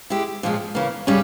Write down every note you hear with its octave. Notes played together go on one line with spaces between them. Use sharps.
G#3 E4 G4
A#2 F3 G#3 C#4
C#3 E3 A#3
C#3 G3 C#4 G4